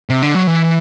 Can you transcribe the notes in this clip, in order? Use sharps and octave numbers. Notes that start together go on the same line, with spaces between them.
C3
D3
F#3
E3